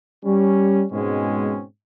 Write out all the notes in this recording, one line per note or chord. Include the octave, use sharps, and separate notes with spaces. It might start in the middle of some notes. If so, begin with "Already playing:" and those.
G3 C#4
G#2 B2 G#3 C4 C#4